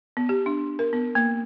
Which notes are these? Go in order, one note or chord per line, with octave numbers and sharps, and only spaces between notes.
B3
G4
D4
A#4
B3
A#3